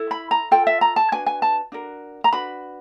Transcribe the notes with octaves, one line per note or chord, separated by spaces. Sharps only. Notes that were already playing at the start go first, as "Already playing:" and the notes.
Already playing: E4 A4
B5
A#5
F4 A4 G5
E5
A#5
A5
D4 F#4 B4 G#5
G#5
A5
D4 F#4 A#4
A#5
D4 F#4 B4 B5